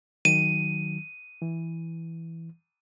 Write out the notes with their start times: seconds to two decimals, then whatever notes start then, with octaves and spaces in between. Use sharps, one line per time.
0.25 D#3 F#3 D#7
1.42 E3